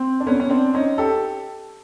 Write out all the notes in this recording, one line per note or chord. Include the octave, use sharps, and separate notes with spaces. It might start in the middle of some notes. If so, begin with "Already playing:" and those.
Already playing: C4
D4
B3 C#4
C#4
C4 D4
C#4 D#4
G4 A4